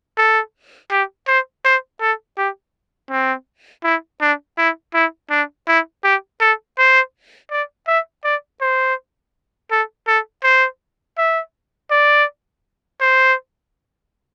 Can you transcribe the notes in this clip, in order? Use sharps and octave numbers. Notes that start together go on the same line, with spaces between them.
A4
G4
C5
C5
A4
G4
C4
E4
D4
E4
E4
D4
E4
G4
A4
C5
D5
E5
D5
C5
A4
A4
C5
E5
D5
C5